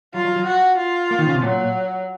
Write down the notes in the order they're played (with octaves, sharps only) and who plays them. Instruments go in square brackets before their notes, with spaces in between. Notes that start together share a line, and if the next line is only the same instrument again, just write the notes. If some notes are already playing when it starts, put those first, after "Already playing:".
[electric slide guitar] F#3 [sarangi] F4
[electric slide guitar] F#3
F#3
[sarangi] F#4
F4
[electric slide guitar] A#3
D#3
C#3
C3
[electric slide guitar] A#2 [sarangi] F#3